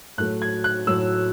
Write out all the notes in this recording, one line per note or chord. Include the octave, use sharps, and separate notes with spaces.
A2 F#3 A3 F#6
G#6
F#6
A2 F#3 A3 E6